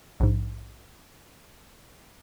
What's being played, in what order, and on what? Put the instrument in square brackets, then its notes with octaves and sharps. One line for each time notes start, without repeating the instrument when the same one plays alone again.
[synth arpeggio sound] A#1 G#2